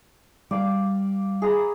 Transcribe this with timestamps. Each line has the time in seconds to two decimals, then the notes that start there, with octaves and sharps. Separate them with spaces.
0.51 G3 D5 F5 D6
1.42 G#4 A#5 B5